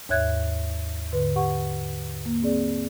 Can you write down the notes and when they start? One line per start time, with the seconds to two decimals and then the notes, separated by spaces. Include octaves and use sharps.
0.09 D#2 G#2 C#5 E5 F#6 G#6
1.13 G#2 D3 B4
1.36 G4 F#5 C#6
2.26 A#3
2.43 C4 G#4 D5